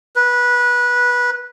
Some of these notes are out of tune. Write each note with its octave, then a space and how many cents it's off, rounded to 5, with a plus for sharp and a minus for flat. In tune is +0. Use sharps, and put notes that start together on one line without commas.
B4 -15